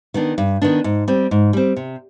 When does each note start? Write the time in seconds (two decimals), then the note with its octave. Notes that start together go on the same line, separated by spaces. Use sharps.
0.14 D#3 B3 D4
0.38 G2
0.62 D#3 B3 D4
0.84 G#2
1.08 G3 C4
1.31 G#2
1.53 G3 C4
1.76 C3